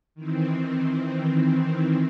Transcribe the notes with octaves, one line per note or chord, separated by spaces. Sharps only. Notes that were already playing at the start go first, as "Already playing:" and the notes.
D#3 E3 C4